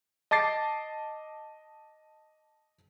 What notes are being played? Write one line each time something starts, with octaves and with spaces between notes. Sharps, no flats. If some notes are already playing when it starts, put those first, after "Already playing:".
D#5 A5 D6 A6 C7